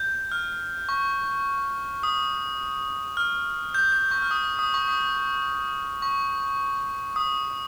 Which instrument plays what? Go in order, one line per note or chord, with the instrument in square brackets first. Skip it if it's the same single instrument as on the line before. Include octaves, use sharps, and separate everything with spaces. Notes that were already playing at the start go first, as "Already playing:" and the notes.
Already playing: [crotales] G6
F6
C#6
D#6
F6
G6
G6
C#6
F6
D#6
D#6
C#6
D#6
C#6
D#6